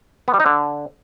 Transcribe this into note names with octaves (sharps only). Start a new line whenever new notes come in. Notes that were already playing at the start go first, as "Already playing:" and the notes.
B3
G3
D#4
D3